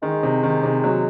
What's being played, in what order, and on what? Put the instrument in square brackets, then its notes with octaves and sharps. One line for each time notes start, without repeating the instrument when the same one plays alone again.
[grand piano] D#3 [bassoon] G#3
[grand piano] C3
D#3
C3
F#3